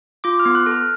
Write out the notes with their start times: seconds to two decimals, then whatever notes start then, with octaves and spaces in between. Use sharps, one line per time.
0.24 F4 D6
0.40 F6
0.46 B3
0.55 F#6
0.66 A4
0.71 F6